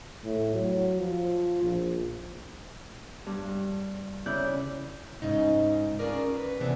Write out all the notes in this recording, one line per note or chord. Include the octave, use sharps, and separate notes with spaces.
A2
F#3
F3
A#1
G2
C#3 E4 D5 F#6 G6
G#2 C#3 D#4
C#4 D4 F4 G#4 A#4 D5
B4
C3 E3 B3 C4 D4 G#4